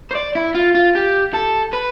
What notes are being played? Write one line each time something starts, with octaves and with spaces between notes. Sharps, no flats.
C5
D5
E4
F4
F4
G4
A4
B4